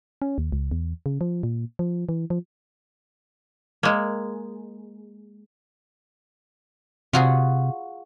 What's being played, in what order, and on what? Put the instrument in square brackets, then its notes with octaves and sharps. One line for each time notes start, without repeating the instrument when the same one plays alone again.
[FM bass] C#4
D#2
C#2
E2
C#3
F3
A#2
F3
E3
F3
[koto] G#3 A#3
[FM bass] C3 [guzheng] F4 F#4 G#4